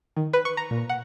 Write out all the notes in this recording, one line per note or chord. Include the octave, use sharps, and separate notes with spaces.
D#3
B4
C#6
A#5
A#2
F#5